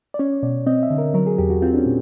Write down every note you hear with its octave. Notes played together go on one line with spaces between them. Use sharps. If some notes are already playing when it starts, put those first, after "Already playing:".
D5
C#4 C#5
B2 D5
C4 D#5
E5
D3
A#4
F#3 A#4
G#4
E2 G4
F#4
C4 F4
D4
C#4
A#2